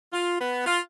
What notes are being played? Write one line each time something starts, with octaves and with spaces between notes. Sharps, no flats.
F4
B3
F4